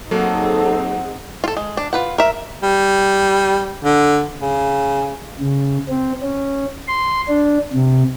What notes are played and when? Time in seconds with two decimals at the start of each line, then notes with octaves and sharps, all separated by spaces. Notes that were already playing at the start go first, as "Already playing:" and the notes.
0.11 F#3 A#3 C4 D#4 G#4 A4 F#5
1.44 F4 A4
1.57 G#3
1.77 D4
1.93 F4 B4 F#5
2.18 A#4 E5
2.63 G3
3.84 D3
4.42 C#3
5.40 C#3
5.89 C4
6.22 C#4
6.88 C6
7.28 D4
7.73 C3